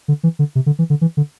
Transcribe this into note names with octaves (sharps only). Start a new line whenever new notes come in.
D3
E3
D3
C3
D3
E3
D3
E3
D3